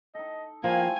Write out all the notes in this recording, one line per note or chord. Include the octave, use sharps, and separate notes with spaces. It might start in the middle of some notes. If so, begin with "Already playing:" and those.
D#4 A4 D#5
F3 G3 A3 A#3 F4 G#5